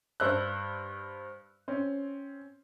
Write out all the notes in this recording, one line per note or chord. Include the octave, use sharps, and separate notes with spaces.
G2 C5 E6 F#6
C4 C#4